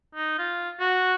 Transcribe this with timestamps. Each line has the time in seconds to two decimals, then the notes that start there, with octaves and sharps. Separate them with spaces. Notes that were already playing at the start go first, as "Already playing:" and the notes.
0.15 D#4
0.39 F4
0.80 F#4